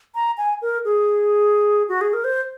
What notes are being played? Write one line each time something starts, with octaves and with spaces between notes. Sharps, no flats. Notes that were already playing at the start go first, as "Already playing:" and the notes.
A#5
G#5
A#4
G#4
F#4
G#4
A#4
C5